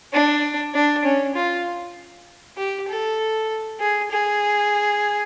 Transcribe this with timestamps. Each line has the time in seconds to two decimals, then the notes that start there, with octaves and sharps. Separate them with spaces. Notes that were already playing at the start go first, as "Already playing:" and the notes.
0.13 D4
0.74 D4
1.04 C#4
1.35 F4
2.57 G4
2.88 A4
3.80 G#4
4.11 G#4